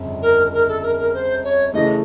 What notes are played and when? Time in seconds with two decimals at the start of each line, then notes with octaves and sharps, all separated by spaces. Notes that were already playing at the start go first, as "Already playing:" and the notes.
Already playing: G1 F2 C#3
0.22 A#4
0.53 A#4
0.68 A4
0.83 A#4
0.99 A#4
1.14 C5
1.44 C#5
1.74 C#3 E3 A3 D#5